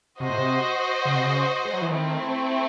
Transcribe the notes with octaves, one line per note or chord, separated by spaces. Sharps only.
C3 F#4 C5 D#5
A2
C3
C#3
C3
C#3
G#3
F#3
E3
D#3 A3 C4 E4